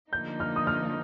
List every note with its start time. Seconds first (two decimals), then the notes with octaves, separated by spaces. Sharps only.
0.13 D3 F3 A#3 D#4 G6
0.40 F6
0.56 D#6
0.67 F6